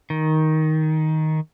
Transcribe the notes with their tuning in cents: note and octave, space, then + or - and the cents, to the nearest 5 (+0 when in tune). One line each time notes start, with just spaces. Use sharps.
D#3 +10